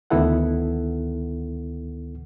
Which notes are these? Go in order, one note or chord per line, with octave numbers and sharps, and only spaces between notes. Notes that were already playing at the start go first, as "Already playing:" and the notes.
D2 D#3 B3 E4 A4 F#5